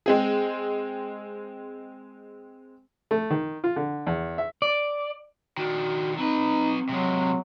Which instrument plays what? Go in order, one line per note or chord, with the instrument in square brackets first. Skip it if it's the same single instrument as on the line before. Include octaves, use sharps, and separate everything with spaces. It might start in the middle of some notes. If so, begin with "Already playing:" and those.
[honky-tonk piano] G#3 C4 G#4
[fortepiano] A3
D#3
F4
D3
E2
E5
[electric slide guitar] D5
[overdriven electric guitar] D#3 D4 [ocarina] F#4
[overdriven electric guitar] F#3 B4 [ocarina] C4 [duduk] D#4
[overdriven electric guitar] C3 G#3 [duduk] F#3